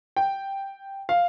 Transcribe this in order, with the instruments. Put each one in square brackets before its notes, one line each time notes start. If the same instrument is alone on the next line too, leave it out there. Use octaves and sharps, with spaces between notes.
[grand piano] G5
F5